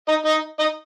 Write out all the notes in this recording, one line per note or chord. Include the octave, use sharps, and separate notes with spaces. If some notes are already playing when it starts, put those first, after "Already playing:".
D#4 D#5
D#4 D#5
D#4 D#5